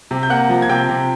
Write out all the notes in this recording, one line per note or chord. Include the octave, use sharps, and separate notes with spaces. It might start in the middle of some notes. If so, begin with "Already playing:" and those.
C3
G6
A#3 F#5 F#6
F3
G#6
C3 G5 G6
C3